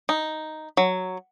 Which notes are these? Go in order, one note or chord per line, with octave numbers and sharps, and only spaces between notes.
D#4
F#3